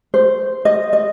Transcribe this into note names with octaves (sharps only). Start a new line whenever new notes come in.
C5
D#5
D#5